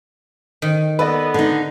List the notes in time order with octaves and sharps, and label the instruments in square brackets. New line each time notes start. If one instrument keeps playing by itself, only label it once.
[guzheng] D#3
[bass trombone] B3 [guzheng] A4 [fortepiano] B4 D5 D#5
[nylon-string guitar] D3 D#4